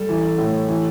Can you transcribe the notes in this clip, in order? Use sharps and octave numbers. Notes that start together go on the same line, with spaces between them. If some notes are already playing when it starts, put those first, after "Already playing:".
Already playing: G3 A4
E3
A2
E3